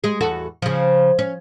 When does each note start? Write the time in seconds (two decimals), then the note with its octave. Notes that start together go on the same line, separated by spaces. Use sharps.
0.04 G#3 G#4
0.21 E2 F#4 A4
0.62 C#3 F3
1.19 C#4